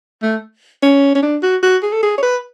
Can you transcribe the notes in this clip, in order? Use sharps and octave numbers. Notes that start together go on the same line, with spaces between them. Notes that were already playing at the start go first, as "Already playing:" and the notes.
A3
C#4
C#4
D4
F#4
F#4
G#4
A4
G#4
C#5
B4